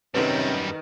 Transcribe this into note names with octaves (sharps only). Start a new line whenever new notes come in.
F#2 C3 D#3 G3 C#4 B4